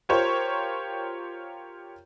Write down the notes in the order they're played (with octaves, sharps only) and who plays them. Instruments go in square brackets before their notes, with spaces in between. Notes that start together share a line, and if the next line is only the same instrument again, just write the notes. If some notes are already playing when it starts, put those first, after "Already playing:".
[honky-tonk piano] F4 G4 A#4 C5 C#5